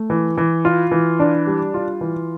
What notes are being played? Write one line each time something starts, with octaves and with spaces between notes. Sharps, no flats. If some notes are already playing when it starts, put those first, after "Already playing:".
Already playing: A3
E3
E3
F4
E3
D4
G3
F4
E3